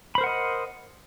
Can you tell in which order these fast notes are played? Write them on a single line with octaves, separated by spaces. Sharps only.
B5 C5 A#4 F#5 D#5